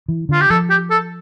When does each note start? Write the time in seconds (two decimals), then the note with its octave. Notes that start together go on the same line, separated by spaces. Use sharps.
0.08 E3
0.29 D3 F4
0.41 G4
0.50 F3 A4
0.70 G4
0.91 A4